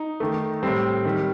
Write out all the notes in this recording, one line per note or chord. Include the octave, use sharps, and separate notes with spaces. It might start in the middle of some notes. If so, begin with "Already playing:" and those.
Already playing: D#4
D#3 A3
A2 G3 C4
D#3 G3